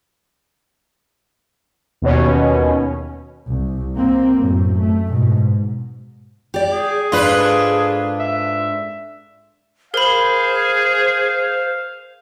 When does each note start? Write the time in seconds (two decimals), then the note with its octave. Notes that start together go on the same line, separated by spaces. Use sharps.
2.02 D#2 B2 C#4
3.47 C2
3.96 A#3 C4
4.41 F#2 A2
4.79 A3
5.08 G#2 B2
6.54 G4 D5
6.72 G#4
7.12 G#2 D4 F4 A4 B4
8.20 E5
9.94 G#4 A#4 C5 F5 B5